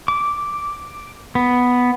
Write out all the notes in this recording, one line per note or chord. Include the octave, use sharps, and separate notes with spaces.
D6
B3